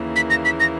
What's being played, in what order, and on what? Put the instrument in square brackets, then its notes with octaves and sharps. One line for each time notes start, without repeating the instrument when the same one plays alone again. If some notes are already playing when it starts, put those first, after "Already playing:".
Already playing: [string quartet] D#2 C#3 E3 A#3
[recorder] B6
A#6
B6
A#6